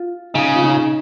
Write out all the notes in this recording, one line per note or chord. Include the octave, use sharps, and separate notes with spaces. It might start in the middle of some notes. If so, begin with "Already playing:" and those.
Already playing: F4
C#3 D#4
F4
D#4